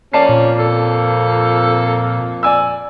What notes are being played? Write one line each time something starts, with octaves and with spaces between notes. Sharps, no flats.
F2 A#3 C#4 D5 A5 C7
A#2
A4
D5 G#5 E6